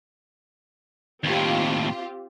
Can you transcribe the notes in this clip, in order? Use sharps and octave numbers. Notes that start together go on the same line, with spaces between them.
D#2 A2 C4 F4 G4